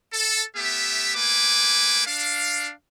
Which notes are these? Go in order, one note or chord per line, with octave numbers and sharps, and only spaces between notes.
A4
A3 B3 G4 E5
A3 A#3 B4 G#5 D6
D4 F5